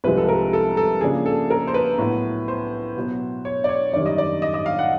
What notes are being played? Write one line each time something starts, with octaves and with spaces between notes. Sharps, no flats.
C2 C3 F3 G#3 B4
A4
A#4
A4
A4
C#3 F3 A#3 D4 G#4
A4
A#4
C5
B4
A2 F#3 B3
C5
B2 F#3 B3
C#5
D5
C#5
F#2 D#3 G3 D5
D#5
D5
D#5
D#5
F5
F#5